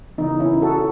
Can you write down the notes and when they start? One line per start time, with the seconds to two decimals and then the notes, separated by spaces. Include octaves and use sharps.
0.18 C#3 E3 B3 D#4
0.40 C#4 E4
0.62 F#4 A4